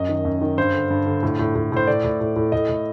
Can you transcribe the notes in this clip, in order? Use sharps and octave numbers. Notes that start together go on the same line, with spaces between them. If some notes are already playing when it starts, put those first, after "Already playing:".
Already playing: F#2 D#5
D#3
F#2
D#3
G2 C5
D3
G2
D3
A2
A2
A2
A2 C5
A2 D5
A2
A2
A2
A2 D#5
A2